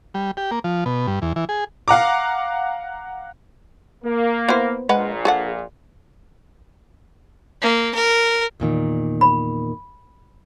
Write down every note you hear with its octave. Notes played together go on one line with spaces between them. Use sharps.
G3
G4
A#3
F3
B2
G2
E2
E3
G#4
F5 F#5 A#5 D6
A#3
B3 E4 C5
A#1 A#2 G#3 B4 F#5
G#4 A4 F#5
A#3
A#4
E2 A#2 D#3
B5